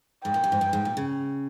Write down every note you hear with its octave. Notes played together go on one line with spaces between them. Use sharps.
G#2 G5
A#2
G2
G#2
G2
G#2
A#2
C#3